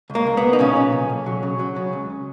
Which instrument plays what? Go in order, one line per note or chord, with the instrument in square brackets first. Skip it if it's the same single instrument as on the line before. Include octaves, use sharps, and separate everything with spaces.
[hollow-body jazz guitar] C#2
A#3
C#2
B3
C#2
D#4
A#2 C#3 C#4
B1
B1
B1
F#3
C#3
F#3
C#3
C#2